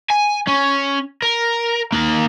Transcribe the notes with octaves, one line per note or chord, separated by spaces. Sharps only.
G#5
C#4
A#4
A#3 D#4